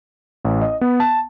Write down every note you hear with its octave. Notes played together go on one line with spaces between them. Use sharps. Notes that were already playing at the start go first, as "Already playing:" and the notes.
A1
D#5
B3
A5